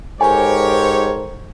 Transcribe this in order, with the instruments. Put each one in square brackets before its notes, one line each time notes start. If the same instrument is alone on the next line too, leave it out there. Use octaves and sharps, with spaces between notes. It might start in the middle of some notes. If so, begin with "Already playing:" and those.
[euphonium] G#2 [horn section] G4 C#5 [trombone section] A4 A#4 C5 [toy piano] G#5